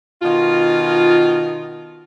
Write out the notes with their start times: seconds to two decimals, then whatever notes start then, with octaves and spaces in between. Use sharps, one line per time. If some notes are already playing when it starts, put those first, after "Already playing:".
0.22 B2 D#3 F4